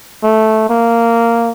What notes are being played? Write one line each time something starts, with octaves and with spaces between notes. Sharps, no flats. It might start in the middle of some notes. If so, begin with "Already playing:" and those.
A3
A#3